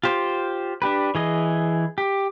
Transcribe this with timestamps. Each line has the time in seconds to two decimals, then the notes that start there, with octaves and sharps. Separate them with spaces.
0.03 F4 G4 C5
0.82 D4 G4 B4
1.15 E3 G#4 D#5
1.98 G4